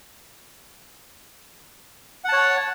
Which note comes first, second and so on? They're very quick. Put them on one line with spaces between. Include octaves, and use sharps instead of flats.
F#5 A5 C#5